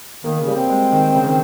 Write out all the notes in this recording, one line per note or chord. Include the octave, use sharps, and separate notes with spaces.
D#3 A#3
C#3
G3
C4
G#3
D#3
C#3
D#3